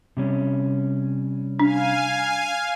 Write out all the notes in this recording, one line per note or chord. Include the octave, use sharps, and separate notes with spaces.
C3 G3 C#4
D4 F5 G#5